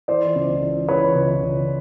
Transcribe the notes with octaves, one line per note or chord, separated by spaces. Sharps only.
E3 C5 D5
C#2
E3
E3 B4 C#5
C#2
C#2